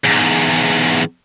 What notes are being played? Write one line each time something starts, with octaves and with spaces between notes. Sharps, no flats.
E2 G#2